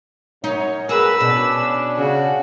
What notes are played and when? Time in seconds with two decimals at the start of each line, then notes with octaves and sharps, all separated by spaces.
0.44 F#2 D#4 C#5
0.89 B2 F#4 G#4 A#4 B4 E6
1.21 B2 C#4 D4
1.98 C#3 F#4